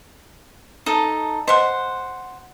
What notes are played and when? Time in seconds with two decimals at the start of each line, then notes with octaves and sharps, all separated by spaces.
0.86 D#4 A4
1.48 C5 D#5 F#5 C6